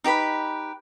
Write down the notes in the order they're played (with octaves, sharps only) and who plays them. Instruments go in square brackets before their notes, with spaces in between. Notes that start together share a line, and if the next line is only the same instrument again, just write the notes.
[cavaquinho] D#4 G4 B4 B5